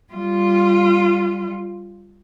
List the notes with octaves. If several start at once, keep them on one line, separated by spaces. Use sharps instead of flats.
G3 F4